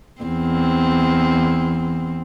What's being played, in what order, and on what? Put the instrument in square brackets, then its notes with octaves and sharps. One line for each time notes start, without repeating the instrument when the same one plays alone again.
[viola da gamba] E2 C4